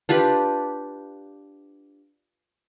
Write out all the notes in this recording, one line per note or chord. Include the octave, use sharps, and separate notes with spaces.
D4 F4 G4 B4